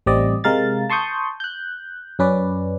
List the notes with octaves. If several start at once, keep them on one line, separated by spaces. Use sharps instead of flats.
A1 G3 C4 D5 D#5
C3 G#3 A#4 F5 A6
A5 C6 C#6 D#6 G6
F#6 G6
F#2 C#4 B4 D5